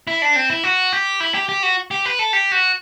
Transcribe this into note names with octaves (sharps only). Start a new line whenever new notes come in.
E4
D4
C4
E4
F#4
G4
E4
G4
G4
F#4
G4
B4
A4
G4
F#4